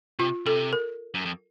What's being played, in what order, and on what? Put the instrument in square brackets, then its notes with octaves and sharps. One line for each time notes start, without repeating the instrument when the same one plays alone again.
[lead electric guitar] C3 [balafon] F4
[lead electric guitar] C3 [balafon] A4
[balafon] A#4
[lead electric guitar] F#2
F2